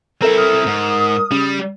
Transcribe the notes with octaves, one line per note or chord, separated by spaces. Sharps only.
C4 E4 A4 A#4 E5
D#6 F6
G#2
C#3 G3